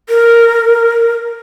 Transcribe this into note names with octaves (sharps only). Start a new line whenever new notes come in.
A#4